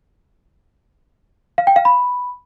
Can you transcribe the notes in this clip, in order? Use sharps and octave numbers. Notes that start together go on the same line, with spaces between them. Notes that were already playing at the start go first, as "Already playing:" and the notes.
F5
G5
F5
B5